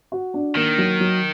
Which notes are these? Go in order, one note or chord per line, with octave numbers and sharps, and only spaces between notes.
F#4
D4
D#3 A#3
F#3
F#3